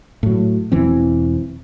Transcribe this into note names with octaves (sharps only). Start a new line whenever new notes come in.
A2 F#3
E1 E3 C4